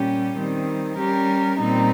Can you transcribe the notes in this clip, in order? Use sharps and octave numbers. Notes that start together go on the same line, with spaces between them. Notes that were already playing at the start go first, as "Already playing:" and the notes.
Already playing: A#2 G3 C#4 G4
D#3 G3 C4
G3 C#4 G4 A#4
A#2 G3 C4 D#4